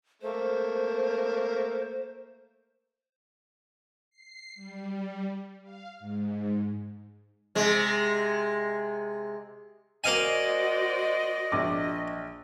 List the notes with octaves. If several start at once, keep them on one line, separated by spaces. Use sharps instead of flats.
A3 A#3 C5
C7
G3
F5
G#2
C3 G#3
A#3 F#4 C5 D5 D#5 F5 G#5
A#1 D6